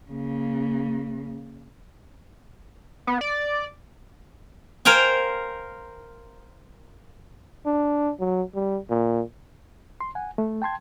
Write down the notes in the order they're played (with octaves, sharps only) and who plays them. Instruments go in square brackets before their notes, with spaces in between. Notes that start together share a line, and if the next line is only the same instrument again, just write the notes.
[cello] C#3 A#3
[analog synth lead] B3
D5
[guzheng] A#4 C5 F5 G5 G#5
[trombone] D4
F#3
G3
A#2
[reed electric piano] C6
F#5 G#5
A3
G5 A5 C6 G#6